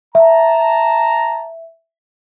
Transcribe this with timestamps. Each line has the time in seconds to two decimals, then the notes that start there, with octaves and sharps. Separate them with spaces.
0.15 E5 A5 A#5